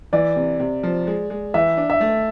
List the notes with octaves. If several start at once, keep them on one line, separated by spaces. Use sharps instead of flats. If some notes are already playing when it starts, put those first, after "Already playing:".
E3 D5
C3
C3
F3
G#3
G#3
E3 E5
D4
E5
A3